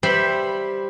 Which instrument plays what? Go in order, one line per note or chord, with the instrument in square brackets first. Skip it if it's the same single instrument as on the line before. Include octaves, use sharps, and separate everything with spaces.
[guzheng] G3 C5 E5 B5 C6